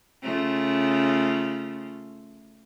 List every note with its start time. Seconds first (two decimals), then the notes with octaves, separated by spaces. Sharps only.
0.22 C#3 A3 F4